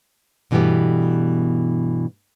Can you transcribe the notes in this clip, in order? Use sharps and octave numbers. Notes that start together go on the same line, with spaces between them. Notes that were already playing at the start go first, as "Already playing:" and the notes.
G2 B2 E3 A3 B3 G4